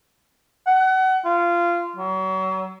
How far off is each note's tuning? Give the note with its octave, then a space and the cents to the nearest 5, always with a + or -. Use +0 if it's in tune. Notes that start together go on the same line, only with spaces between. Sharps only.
F#5 +30
F4 -20
F#3 +35